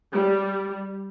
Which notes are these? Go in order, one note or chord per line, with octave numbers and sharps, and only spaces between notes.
G3